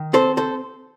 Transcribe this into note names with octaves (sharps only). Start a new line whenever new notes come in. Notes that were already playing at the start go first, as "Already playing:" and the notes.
Already playing: D#3
C4 A4 C5
A4 C5